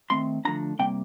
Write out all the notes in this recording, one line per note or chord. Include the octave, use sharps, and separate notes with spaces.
D#3 A3 C4 C6
D3 F3 A3 D4 A#5
C3 G3 A#3 G5